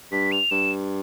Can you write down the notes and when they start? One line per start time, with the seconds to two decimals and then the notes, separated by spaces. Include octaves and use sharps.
0.12 G2 B6
0.32 F7
0.51 G2 E7